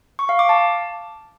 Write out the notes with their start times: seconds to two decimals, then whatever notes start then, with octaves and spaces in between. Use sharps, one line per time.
0.19 C#6
0.29 F5
0.39 D6
0.49 A5